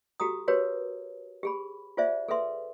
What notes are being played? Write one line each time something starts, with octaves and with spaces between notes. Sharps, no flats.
F#4 G4 A4 A#5 D#6
F#4 G4 A#4 B4 C#5
G4 G#4 B5
F4 G#4 C5 D5 E5
G#4 A4 B4 E5 C6